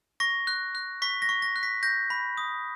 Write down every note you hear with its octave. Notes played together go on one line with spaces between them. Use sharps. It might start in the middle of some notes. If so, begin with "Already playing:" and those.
C#6 A#6
F#6
F#6
C#6 B6
A#6
C#6
A#6
F#6
B6
G6 A#6
B5
D#6